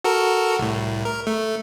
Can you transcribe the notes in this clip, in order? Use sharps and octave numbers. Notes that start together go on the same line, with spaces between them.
F#4 A4 A#4
C2 A2
A#4
A3